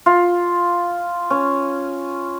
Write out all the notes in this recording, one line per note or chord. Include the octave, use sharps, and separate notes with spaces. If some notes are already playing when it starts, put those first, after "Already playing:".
F4
C#4